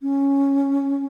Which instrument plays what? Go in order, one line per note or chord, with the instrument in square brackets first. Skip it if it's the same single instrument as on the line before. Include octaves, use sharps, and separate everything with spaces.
[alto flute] C#4